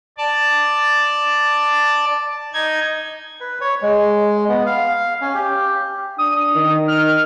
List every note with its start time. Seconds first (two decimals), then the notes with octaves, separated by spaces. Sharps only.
0.18 D5 A5
2.53 D#4 G#6
3.40 B4
3.61 C#5
3.82 G#3
4.49 B3
4.66 F5
5.21 C#4
5.35 G4
6.18 D4 D#6
6.55 D#3
6.88 F6